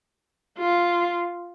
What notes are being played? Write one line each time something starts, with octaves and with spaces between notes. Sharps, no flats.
F4